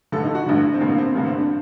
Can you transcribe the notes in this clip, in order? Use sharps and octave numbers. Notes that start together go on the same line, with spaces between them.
A1 G2 D3 A4
D#4
F#4
A1 G2 D3 D4
C4
A1 G2 D3 A#3
C4
A1 G2 D3 A#3
C4
D4